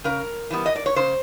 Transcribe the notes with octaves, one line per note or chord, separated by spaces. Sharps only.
C#3 A#4
E3 G3 B3
D#5
D5
C#5
C#3 C5